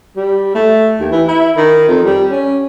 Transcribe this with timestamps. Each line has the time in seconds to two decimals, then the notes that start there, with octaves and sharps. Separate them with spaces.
0.16 G3
0.55 A3
1.00 D#2
1.12 E3
1.28 E4
1.57 D#3
1.88 F2
2.05 G3
2.31 C#4